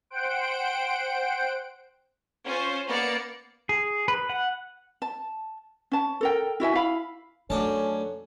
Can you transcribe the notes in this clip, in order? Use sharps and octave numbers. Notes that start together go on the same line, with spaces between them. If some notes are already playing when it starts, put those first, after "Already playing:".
C5 F#5 G5 D7
C#4 F4 C5
A#3 B3 D5 C#7
G#4
B4
F#5
A5
C#4 A5
A4 A#4 G5
E4 F#4 E5 G#5
E4 F5 B5
F#2 A3 C#4 D4 A4 A5